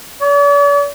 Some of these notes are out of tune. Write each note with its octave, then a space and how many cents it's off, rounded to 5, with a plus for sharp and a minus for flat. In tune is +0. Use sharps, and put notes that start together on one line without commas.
D5 -45